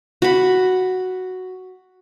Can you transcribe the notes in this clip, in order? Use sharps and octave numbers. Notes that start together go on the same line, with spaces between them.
F#4 B5